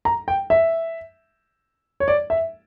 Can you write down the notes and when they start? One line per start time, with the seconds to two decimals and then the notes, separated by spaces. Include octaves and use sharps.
0.05 A#5
0.28 G5
0.50 E5
2.00 C#5
2.08 D5
2.30 E5